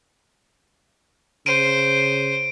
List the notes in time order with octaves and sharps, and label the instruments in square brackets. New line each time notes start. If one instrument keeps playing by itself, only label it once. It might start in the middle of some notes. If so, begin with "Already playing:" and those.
[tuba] C#3 [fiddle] C5 [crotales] D7 D#7